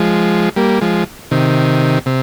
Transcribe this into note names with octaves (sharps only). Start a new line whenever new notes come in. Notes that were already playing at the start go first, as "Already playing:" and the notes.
Already playing: F3 G#3
G3 A#3
F3 G#3
C3 D#3
C3